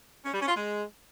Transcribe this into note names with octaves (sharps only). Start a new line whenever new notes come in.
C#4
G3
C#4
F4
G#3